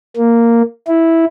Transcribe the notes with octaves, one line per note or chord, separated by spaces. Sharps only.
A#3
E4